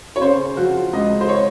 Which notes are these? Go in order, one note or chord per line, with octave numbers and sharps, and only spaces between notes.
C#5
C#3 C5
F3 F#4
C#2 D#5
C5
C#5